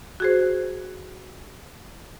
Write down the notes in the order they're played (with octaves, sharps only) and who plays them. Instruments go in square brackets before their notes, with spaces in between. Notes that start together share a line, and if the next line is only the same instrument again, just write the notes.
[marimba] F#4 G#4 C5